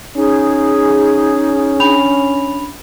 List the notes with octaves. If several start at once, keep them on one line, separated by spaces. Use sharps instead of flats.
C#4 D#4 G#4
D4 B5 F7